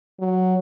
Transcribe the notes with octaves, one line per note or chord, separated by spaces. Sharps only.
F#3